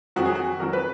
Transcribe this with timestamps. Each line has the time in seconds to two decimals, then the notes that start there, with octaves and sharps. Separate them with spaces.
0.16 F2 D#3 F#3 F#4
0.26 G#4
0.35 F#4
0.59 F2 D#3 F#3 A#4
0.73 B4